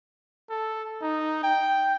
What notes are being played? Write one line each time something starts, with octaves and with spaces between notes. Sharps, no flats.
A4
D#4
G5